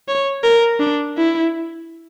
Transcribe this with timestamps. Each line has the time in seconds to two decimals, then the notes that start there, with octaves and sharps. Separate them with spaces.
0.08 C#5
0.43 A#4
0.80 D4
1.17 E4